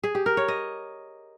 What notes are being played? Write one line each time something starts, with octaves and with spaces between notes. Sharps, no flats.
G#4
G4
A#4
C#5
D#5